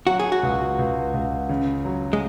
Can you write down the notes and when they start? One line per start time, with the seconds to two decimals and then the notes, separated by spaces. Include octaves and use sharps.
0.06 F#3 F#4
0.19 G#4
0.32 F#4
0.43 C#2
0.79 C#2
1.14 C#2
1.49 C#3
1.85 F#3
2.13 G#3